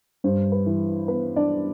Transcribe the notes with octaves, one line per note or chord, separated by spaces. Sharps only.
G2 C5
B4
E3
B3 B4
D4 D5